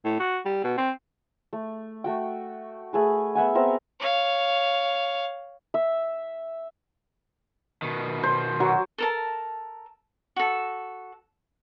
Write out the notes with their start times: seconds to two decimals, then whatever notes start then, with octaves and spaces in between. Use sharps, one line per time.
0.05 A2
0.19 F#4
0.45 G3
0.64 B2
0.78 C4
1.53 A3
2.04 A3 F#4 G5
2.93 A3 G#4 B4
3.35 B3 E5 F#5 G#5
3.55 B3 C4 A#4 E5
4.00 C#5 F5
5.74 E5
7.82 B2 D#3
8.23 C5
8.60 F#3 F#4
8.98 A4 A#4 A5
10.36 F#4 A4